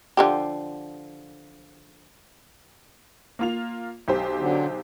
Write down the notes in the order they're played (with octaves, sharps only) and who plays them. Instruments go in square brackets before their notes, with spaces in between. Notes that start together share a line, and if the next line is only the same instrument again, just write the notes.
[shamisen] D3 F3 G4
[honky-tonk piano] A#3 F4 F7
B1 G4 C5
[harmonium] D3 F#3